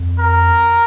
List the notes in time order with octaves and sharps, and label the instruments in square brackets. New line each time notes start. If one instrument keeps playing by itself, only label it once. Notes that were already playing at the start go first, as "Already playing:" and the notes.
Already playing: [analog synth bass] F2
[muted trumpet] A#4